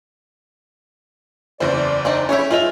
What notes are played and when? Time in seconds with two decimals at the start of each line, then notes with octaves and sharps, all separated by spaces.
1.60 F#1 E2 E3 C5 D5
2.05 C4 D4 D#4
2.29 F2 C#4 E4 G4 G#4 C#5 E5 C#6
2.51 G2 F4 G#4 D#5 E5 F7